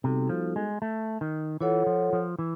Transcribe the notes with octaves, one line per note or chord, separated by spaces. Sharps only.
C3 G3 B3 D#4 F#4 A4
F3
G#3
A3
D#3
E3 F4 A4 C#5 F#5
F3
F3
E3